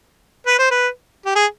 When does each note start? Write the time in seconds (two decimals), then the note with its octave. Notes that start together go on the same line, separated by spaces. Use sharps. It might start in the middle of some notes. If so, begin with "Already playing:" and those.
0.47 B4
0.59 C5
0.71 B4
1.26 G4
1.36 G#4